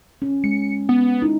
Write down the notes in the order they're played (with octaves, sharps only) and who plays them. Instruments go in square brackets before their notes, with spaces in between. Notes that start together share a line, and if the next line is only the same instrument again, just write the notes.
[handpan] C#4
[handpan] G#3 [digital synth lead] C#7
[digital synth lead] B3
[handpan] D#4 E4